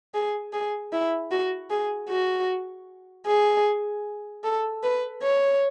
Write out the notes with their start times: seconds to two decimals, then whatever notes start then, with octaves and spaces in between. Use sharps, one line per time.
0.15 G#4
0.53 G#4
0.93 E4
1.31 F#4
1.71 G#4
2.09 F#4
3.27 G#4
4.44 A4
4.83 B4
5.23 C#5